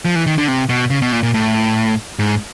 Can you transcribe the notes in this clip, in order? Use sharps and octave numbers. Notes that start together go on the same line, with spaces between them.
F3
E3
D#3
D3
C3
B2
C#3
B2
A#2
A#2
A2
G#2